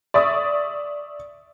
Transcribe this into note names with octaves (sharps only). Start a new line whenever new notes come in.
D5 E5 C#6 D#6